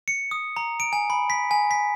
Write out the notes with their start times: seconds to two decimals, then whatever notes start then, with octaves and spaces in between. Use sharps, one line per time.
0.08 C#7
0.31 D#6
0.57 A#5
0.80 D7
0.93 G#5
1.10 B5
1.30 B6
1.51 G#5
1.71 B6